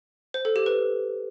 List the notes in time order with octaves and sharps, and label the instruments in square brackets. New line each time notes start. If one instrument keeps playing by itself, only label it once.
[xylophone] C5
A4
G4
B4